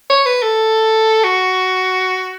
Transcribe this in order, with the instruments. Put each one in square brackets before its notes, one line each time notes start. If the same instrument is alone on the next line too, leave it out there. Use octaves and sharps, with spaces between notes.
[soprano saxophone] C#5
B4
A4
F#4